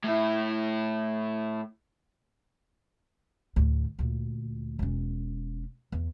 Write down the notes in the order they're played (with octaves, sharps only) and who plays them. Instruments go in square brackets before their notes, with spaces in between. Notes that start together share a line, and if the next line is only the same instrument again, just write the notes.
[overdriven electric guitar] A2 E4
[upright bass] D2 A2
D2 A#2
E1 C#4
E2